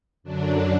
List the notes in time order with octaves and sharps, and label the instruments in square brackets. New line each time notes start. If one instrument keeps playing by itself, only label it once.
[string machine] F#2 D3 F#3 D4